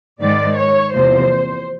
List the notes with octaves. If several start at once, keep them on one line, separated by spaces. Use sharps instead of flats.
G#2 D#3 G#3 D5
C#5
E2 C3 F3 A#3 C5